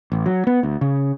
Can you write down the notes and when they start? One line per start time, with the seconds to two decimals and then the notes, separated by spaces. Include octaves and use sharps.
0.12 A1
0.26 F#3
0.47 B3
0.63 D2
0.81 C#3